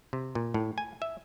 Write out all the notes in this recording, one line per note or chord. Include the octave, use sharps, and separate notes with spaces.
C3
A#2
A2
G#5
E5